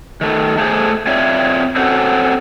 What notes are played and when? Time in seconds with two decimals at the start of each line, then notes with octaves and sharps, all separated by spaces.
0.21 D#3 A3
0.58 A3 G#4 C5
1.07 C4 F4 C#5 D5 E5 F5
1.76 C4 C#4 F#4 A4 C5 C#5